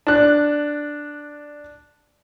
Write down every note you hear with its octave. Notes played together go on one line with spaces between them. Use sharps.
D4 F#6